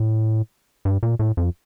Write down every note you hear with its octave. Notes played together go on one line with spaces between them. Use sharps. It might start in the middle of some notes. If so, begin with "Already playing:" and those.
Already playing: A2
G2
A#2
A2
F2